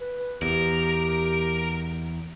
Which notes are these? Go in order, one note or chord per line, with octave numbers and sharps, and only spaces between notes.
B4
E2 G4 A#4